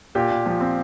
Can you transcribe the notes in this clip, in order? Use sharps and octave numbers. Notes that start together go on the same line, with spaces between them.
A#2 G4
A#2
F3
C4